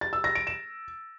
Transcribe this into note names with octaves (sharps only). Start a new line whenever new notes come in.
A6
E6
A#6
D7
E7